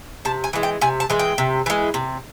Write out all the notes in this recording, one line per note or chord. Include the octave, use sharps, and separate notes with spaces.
C3 A5
G#5
E3 G#3
G5
C3 G#5
A5
E3 G#3
G5
C3
E3 G#3
C3